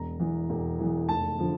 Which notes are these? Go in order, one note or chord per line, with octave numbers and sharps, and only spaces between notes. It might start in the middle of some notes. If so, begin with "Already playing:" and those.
Already playing: E1 A#5
E2 E3
E1
E2 E3
F1 A5
D3 F3